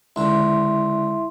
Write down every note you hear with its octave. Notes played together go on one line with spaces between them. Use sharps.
C#2 D3 E4 E5 C6